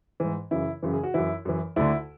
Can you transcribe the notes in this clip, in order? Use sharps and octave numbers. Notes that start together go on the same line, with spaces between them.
G#2 E3
F#2 C#3 E3 E4
F#2 C#3 E3
G#4
F#4
F#2 E3 E4
F#2 E3
D2 D3 E4